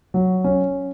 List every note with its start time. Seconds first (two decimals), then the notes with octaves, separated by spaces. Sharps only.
0.14 F#3
0.44 C#4